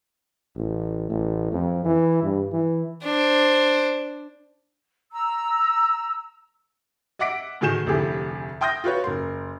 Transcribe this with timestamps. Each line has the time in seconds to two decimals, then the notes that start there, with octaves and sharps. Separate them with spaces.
0.56 A1
1.09 A1
1.52 F2
1.85 E3
2.22 G2
2.53 E3
3.02 D4 C5
5.12 A#5 E6
7.19 D#5 E5 F#5 D6 B6 D7
7.61 A2 D#3 F#4 G#4 G6 E7
7.86 F1 D2 E4 G4 G#4
8.61 E5 G5 C6 D#6 G6 A#6
8.84 F4 F#4 B4 C#5
9.04 F#1 A#4 C6